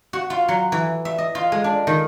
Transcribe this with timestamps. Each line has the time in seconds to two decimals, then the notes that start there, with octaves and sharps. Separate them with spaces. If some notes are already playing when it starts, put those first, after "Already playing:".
0.13 F#4
0.30 F4
0.48 F#3
0.72 E3
1.05 E5
1.18 D#5
1.35 F4
1.52 G#3
1.64 D4
1.87 D#3